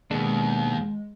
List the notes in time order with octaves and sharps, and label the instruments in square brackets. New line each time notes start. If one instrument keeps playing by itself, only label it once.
[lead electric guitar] D#2 [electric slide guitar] B2 B3 D4 [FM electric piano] G#3